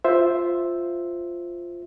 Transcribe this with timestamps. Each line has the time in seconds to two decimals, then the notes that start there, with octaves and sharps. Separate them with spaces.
0.04 F4 C5 E5